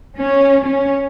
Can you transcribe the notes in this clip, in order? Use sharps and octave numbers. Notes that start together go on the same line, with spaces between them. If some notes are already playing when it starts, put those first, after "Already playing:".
C#4
C#4